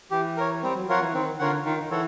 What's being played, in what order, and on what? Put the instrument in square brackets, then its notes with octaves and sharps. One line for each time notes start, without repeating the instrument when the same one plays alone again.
[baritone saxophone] E3 [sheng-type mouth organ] G4
[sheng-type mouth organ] A#4 C#5
[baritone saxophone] G3 [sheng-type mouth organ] C4
[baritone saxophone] F#3
[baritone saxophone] F3 [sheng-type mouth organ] F4 A#4 C#5 F#5
[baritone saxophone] E3
[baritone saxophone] D#3 [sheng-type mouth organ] C4
[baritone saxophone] D3 [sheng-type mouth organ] F4 A#4 C#5 F#5
[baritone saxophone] D#3 [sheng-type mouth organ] F4
[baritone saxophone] D#3
[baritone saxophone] E3 [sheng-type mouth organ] A4 C#5 F#5